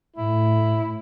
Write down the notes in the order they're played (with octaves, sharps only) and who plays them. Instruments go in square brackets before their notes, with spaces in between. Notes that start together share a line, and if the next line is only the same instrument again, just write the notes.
[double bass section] A2 [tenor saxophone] E4